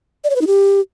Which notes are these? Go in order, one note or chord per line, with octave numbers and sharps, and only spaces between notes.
D5
C#5
B4
D#4
G4